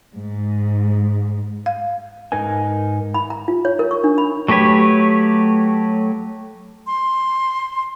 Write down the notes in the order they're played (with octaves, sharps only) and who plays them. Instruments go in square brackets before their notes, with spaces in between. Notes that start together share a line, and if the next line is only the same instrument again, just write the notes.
[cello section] G#2
[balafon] F5
[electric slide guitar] G#2 D#4 A#4 B4 G#5
[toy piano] B5
A#5
F4
C#5
A#4
C#6
D4
B5
[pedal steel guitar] F#3 A3 G4 B4 C#5
[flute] C6